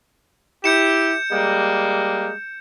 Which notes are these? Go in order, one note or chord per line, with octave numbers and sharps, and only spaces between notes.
E4 G4 G6 C#7 E7
G3 G#3 A#3